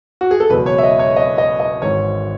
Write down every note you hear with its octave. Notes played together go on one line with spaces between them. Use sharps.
F#4
G#4
A4
F#1 E2 B2 G#3 B4
C#5
E5
D#5
C#5
D#5
D#5
D#5
G#1 G#2 E3 G#3 C#5